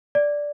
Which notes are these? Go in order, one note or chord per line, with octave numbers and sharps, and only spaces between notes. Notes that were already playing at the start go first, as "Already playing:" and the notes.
D5